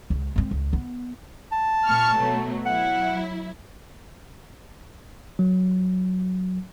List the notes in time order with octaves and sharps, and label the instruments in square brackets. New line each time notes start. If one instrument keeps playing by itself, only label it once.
[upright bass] C#2
G#3 C4
C#2
B3
[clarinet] A5
[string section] A#2 C#6 F6
B2 F#3 A3
[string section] F#3 E4 [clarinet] F#5
[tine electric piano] F#3